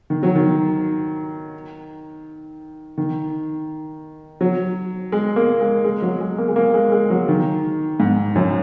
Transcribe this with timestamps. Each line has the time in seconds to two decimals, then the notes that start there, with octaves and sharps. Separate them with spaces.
0.10 D#3
0.23 F#3
0.35 D#3
2.98 D#3
4.41 F#3
5.12 G#3
5.36 A#3
5.60 G#3
5.85 G#3
6.02 F#3
6.20 G#3
6.38 A#3
6.48 G#3
6.56 A#3
6.74 G#3
6.92 G#3
7.10 F#3
7.28 D#3
8.00 G#2
8.36 F#2